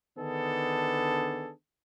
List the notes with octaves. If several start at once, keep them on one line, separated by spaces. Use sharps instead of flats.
D3 D#3 B3 D4 G#4 A4